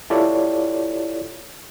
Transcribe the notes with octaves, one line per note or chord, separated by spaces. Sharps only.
E4 F4 G4 A4 C#5 D5